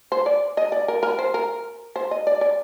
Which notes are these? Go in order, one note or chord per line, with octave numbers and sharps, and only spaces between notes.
C5
D5
D#5
D5
A#4
A#4
C5
A#4
C5
D#5
D5
D5